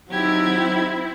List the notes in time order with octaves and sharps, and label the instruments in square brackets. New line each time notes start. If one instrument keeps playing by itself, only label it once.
[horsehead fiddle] F#3 D#4 [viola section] C4 E4 [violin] G4 G#6